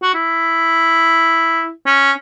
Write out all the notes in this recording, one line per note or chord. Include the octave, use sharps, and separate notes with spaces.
F#4
E4
C#4